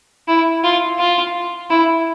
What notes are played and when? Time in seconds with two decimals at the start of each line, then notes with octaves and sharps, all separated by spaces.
0.28 E4
0.64 F4
0.99 F4
1.70 E4